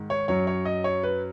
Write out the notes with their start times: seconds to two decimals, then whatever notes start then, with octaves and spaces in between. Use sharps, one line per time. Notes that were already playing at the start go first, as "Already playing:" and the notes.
Already playing: G#2 D#3
0.10 C#5
0.28 F#2 F#3 C#5
0.47 C#5
0.65 D#5
0.84 C#5
1.03 B4